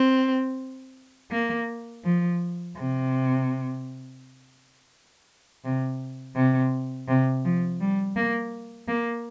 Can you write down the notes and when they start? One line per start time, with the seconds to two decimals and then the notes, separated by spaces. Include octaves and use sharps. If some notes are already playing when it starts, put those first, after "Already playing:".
Already playing: C4
1.31 A#3
2.04 F3
2.76 C3
5.64 C3
6.35 C3
7.08 C3
7.44 F3
7.80 G3
8.15 A#3
8.87 A#3